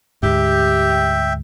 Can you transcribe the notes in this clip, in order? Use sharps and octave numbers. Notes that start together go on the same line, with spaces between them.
D2 G#2 G4 E5 G5